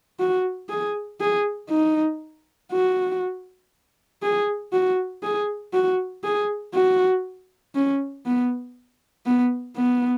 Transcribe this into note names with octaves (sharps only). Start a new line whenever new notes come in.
F#4
G#4
G#4
D#4
F#4
G#4
F#4
G#4
F#4
G#4
F#4
C#4
B3
B3
B3